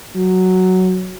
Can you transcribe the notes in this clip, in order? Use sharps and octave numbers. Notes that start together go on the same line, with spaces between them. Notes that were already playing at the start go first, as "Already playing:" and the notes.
F#3